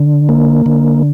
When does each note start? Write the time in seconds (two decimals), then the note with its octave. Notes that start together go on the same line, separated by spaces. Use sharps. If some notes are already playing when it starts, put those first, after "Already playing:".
Already playing: D3
0.29 A#3
0.66 D3